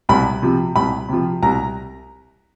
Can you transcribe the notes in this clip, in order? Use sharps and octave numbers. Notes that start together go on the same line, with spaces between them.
C2 B5
C3 F3
C2 B5
C3 F3
C2 A#5